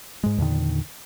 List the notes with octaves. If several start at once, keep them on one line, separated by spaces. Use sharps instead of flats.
G#2 G#3
E2 A#2 D3 D#3